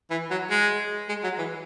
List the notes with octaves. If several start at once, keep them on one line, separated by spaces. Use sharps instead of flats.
E3
F#3
G#3
G#3
F#3
E3